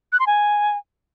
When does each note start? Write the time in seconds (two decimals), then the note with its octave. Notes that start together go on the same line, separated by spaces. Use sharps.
0.12 F#6
0.20 C6
0.27 G#5